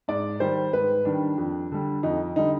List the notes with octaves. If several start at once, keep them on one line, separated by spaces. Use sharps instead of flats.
G#2 D5
D#3 G3 C5
G#2 B4
D#3 G3 D4
F2
D3 G3
F2 D#4
D3 G3 D#4